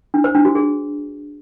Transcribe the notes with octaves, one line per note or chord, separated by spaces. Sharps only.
D4
C5
D4
F#4
G#4